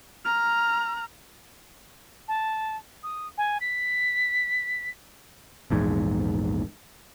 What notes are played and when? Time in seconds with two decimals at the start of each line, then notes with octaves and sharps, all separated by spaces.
0.25 A#5 F6
2.28 A5
3.03 D#6
3.38 G#5
3.61 B6
5.70 A#1 E2 G#2